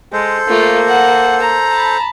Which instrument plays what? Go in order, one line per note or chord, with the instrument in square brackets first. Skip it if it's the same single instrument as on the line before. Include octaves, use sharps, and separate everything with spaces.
[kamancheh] G#3 [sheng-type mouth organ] A4 C5
[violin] A3 F4 [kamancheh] A#3
[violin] F#5
A#5
[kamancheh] A5 B5